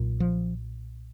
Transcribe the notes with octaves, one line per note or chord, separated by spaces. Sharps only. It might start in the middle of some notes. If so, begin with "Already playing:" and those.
Already playing: B1 A#2
F3